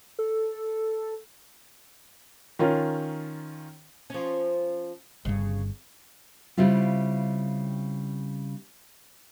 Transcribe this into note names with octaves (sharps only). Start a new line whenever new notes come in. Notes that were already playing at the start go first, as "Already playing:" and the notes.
A4
D#3 C#4 F4 A#4
F3 C#4
G1 G2 C#3
C#3 G3 C4 E4 F4